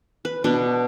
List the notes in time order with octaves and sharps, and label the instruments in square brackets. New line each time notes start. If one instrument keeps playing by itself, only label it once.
[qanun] B4
B2 D4 B4